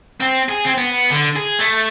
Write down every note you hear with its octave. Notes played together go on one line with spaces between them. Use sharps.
C4
G#4
C4
B3
D3
G#4
A3